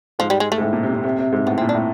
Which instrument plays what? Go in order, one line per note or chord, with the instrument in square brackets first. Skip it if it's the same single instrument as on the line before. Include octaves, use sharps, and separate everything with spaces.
[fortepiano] G#2 [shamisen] F3
[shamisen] G3
G#3
A3
[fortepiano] G#2
A2
A#2
C3
C3
C3
C3
G#2
[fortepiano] A2 [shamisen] B3
[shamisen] C4
[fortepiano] A#2
[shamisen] D4
[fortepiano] A2